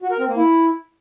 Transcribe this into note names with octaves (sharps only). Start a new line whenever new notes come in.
F#4
A#4
C4
A#3
E4